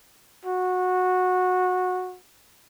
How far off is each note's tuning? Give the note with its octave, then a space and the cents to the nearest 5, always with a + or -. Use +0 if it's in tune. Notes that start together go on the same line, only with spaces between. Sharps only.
F#4 -15